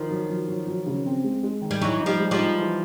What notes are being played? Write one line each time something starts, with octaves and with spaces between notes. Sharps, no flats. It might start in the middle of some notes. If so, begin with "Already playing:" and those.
Already playing: D#3 F3
F#3
F#3
F#3
F#3
C#3
C4
G#3
G#3
D#3
G3
E3 F#3 D#4
D#4
F3 G3
G#3
F3 G3
D#4
E3